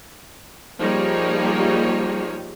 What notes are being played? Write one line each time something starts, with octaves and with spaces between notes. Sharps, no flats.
F3 G3 A#3 D#4 G#4 C#5